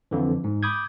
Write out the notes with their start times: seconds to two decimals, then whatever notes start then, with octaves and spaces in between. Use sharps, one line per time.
0.11 F2 D3 E3
0.44 G#2
0.63 B5 D6 D#6 G6 G#6